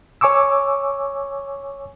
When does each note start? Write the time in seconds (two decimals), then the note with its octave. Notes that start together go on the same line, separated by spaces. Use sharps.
0.21 C#5 G#5 C#6 D6 E6